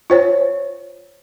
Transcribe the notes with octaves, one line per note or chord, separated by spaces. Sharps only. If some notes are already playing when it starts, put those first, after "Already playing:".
F4 C5 C#5